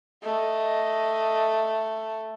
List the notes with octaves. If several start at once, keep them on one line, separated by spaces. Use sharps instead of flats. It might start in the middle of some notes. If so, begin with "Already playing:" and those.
A3 D#5